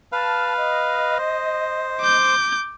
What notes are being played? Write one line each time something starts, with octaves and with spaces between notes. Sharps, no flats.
B4 F5 A5 F6
D#5
C5
D6 G6